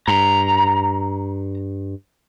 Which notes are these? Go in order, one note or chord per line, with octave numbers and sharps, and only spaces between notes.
G2 A#5